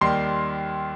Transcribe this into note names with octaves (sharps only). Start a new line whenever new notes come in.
D#2 D#3 G3 C6